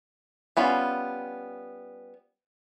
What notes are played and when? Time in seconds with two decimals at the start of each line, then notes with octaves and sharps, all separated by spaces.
0.57 G3 B3 C#4 F4